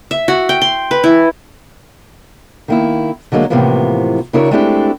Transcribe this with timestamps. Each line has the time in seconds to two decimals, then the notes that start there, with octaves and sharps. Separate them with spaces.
0.11 E5
0.28 F#4
0.49 G5
0.62 C6
0.91 B4
1.04 E4
2.68 D#3 A#3 E4
3.32 D3 F#3 G#3 A#3
3.50 A2 C3 E3 F3 A#3 B3
4.33 C#3 D4 E4 F#4 A#4 C#5
4.51 G#3 A3 C4 D4 E4 G4